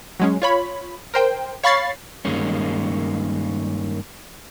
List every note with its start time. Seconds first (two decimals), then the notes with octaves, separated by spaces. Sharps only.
0.20 F#3 G#3 C#4
0.42 F4 C#5 B5
1.14 A#4 C5 G5
1.63 C#5 F5 B5 C#6 A6 C7
2.25 G2 D#3 G#3 A#3 C#4